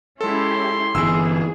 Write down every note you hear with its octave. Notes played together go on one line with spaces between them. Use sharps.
G#3 C#4 E4 G4 A4 C6
G1 E3 G#4 E6